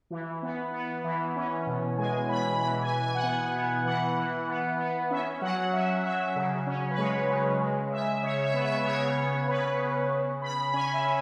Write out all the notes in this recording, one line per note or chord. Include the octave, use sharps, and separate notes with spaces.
E3
B3
B3
E3
C#4
B2
G#3 G#5
B2 B5
E3 B5
G#5
E3
G#5
F#5
B3 G#5
B3
E3 F#5
E3
B3
B3
C#4 E5
F#3 F#5
C#4 E5
F#3 E5
C#3
C#4
B4
G#3 C#5
C#3
G#3
C#3 E5
C#3 C#5
E5
B3
E5
C#3 C#5
B3
C#3 B4
C#3
C#3
C#3 B5
C#4 G#5
E5
C#4